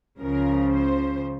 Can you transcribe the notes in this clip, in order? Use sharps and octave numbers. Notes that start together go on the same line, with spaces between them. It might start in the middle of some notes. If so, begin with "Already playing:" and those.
C#2 C#3 F3 A#4
C5